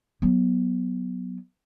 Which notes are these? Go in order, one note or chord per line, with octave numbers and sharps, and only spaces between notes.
F#3 B3